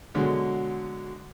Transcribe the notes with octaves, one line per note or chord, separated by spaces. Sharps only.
B2 D3 F#3 G#3